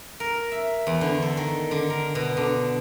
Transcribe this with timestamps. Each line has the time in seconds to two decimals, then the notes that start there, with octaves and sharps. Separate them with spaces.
0.20 A#4
0.52 E5
0.87 E2
1.01 D3
1.22 A4
1.37 D#3
1.71 D3
1.90 A#4
2.15 B2
2.37 D3